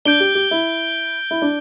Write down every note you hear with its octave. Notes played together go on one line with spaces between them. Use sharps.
D4 G6 D7 G7
G4
G4
E4
E4
D4